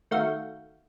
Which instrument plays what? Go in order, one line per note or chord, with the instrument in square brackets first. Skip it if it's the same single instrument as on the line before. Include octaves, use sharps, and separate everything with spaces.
[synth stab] D#3 A3 F#4 F5 G6